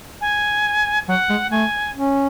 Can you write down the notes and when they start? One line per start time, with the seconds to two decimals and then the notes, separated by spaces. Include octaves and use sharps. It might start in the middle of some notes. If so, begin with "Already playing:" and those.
0.21 G#5
1.08 F#3 F#5
1.30 G#3
1.51 A3 G#5
1.95 C#4